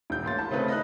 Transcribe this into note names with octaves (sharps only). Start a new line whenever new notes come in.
E1 G6
A1 A#3 C6 A6
A5 B5
C#3 A3 C4 D#4 B4
D#5 B5 F#6